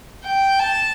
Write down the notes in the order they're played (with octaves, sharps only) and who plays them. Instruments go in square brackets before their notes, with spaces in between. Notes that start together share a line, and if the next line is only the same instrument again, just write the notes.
[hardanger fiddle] G5
A5